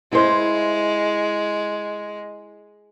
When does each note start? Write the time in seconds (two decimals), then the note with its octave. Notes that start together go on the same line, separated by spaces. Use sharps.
0.12 G#3 E4 C5